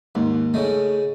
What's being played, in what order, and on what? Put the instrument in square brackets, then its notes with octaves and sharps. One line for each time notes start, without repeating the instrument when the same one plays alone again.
[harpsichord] D#2 [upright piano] G#2
[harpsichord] C#3 D#4 [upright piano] A3